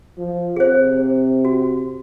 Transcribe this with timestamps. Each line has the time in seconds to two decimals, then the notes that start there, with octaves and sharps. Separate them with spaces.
0.18 F3
0.56 C3 G#4 C5
1.45 F#4